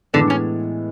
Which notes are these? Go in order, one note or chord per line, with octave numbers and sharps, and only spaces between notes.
A2 D3 E3 G#3 B3
C#4